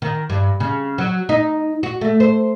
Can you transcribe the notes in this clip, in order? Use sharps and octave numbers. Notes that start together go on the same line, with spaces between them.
D#3
G2
C#3
F#3
D#4
F#4
A3
C5